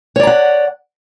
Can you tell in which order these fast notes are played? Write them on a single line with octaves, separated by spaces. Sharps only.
C#5 D5 A#5 F#5